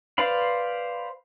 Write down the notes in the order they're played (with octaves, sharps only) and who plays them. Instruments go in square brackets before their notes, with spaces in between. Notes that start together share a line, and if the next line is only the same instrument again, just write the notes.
[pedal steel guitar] B4 C5 D5 F5 B5